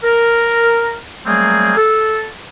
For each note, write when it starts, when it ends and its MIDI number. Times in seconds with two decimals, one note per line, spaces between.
0.03 0.95 70
1.26 1.73 54
1.26 1.73 55
1.26 1.73 57
1.26 1.73 58
1.26 1.73 60
1.26 1.73 68
1.77 2.24 69